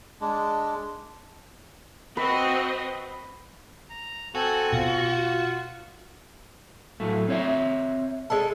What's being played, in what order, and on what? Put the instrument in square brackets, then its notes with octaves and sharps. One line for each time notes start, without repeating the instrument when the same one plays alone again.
[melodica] G#3 D4
[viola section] C4 F#4 D#5 [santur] B4
[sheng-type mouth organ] A#5
[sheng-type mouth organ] C4 A4 G#5 [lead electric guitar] F#4
[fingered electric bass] B2 [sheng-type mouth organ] F4
[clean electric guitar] A2 F#3 A3
C4 C#5 E5
[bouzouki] G#3 A4